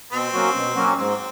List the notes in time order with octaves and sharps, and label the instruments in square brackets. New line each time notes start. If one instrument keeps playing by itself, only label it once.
[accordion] B2 [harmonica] C4
[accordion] F#3 A#3 C#4 F#4
B2
F#3 A#3 C#4 F#4
[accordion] G#2 [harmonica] C4